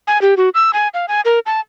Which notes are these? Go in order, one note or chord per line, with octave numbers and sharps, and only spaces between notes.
G#5
G4
F#4
E6
G#5
F5
G#5
A#4
A5